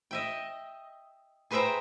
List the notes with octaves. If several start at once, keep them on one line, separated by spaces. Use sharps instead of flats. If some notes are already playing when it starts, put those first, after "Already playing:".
D#5 E5 G5
G#4 B4 C5 E5 G5 A#5